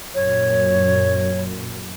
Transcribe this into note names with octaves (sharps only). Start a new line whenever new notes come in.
F#2 A#2 C#5